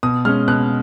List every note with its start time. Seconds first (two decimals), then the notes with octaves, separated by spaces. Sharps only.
0.03 B2 D#6
0.25 G#3 C#4 F6
0.48 B2 F#6